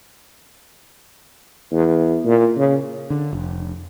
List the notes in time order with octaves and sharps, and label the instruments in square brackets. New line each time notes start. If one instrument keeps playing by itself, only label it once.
[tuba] E2
A#2
C#3
[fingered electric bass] D3
F1